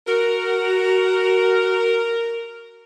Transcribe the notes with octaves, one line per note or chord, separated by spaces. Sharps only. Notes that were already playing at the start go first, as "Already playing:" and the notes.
F#4 A#4